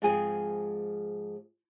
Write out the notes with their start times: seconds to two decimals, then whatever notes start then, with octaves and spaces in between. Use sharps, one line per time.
0.02 G#2 F3 G#3 C4 G#4 G#5